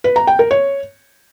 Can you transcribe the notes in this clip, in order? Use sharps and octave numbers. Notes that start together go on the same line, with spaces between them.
B4
A#5
G5
A#4
C#5